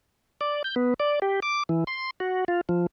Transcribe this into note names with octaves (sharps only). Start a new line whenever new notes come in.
D5
G6
B3
D5
G4
D6
E3
C6
F#4
F4
F3